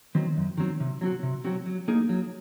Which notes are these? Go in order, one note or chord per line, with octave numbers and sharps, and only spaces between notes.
D#3 F#3 C4
F#2
D#3 F#3 C4
C3
F#3 C4 F#4
C3
F#3 C4 F#4
F#3
A#3 D#4 G#4
F#3